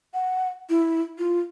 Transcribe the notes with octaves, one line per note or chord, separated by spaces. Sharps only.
F#5
E4
F4